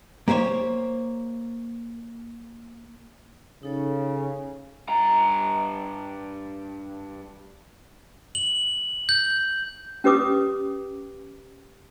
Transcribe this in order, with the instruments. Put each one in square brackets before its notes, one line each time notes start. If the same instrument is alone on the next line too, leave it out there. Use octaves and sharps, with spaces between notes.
[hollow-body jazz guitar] A#3 G4 C5 C#5
[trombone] C#3 [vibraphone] D#4 A4 C#5
[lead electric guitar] G2 A#5
[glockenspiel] F#7
G6
[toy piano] C#4 G4 B4 D6 D#6